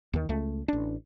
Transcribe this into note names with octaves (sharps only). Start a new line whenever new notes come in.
D#2 D#3
C#2 A3
A1 D4